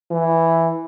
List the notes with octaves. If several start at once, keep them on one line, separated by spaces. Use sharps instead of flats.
E3